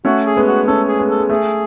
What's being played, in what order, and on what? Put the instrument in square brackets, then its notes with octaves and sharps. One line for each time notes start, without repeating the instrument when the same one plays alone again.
[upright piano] A3 C#4 [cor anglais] F#4
[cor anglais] G#4
[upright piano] G#3 B3
[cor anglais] F#4
[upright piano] A3 C#4 [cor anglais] A4
[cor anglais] G#4
[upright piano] G#3 B3
[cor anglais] A4
[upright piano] G#3
[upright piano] A3 [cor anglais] G#4